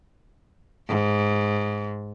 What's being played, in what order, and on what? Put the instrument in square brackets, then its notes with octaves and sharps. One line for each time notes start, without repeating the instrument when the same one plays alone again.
[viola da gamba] G#2